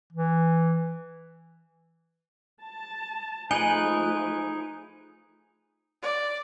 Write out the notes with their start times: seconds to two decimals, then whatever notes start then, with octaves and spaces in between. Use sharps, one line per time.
0.13 E3
2.61 A5
3.51 F3 A3 D#4 G#4 B4 G#5
6.02 D5